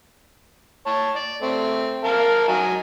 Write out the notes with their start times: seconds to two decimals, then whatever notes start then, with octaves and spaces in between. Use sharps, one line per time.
0.86 C#5 A5
1.16 D5
1.42 A3 C4
2.04 A#4 F5 A5
2.48 F#3 D#4 G#5